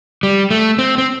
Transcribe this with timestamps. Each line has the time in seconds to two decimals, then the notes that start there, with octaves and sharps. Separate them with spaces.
0.23 G3
0.51 A3
0.79 C4
0.98 C4